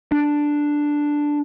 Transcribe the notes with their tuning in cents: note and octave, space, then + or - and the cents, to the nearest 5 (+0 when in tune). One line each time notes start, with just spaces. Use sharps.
D4 +0